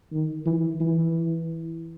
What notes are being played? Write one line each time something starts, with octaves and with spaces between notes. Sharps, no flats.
D#3
E3
E3